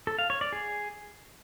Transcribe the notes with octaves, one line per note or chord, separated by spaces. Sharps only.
A4
F5
C#5
D5
G#4